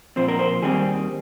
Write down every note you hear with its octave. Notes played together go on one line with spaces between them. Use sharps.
A#2 F3 C4 C5
A#4
C5
D#2 D#3 G3 C4 G#4